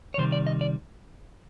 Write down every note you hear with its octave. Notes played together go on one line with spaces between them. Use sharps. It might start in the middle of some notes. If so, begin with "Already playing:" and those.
C#5
C3 D#3 G3 C5
D5
D#5
D5